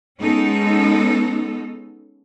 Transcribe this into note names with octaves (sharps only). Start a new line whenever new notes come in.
G#3 B3 C#4 D#4 A4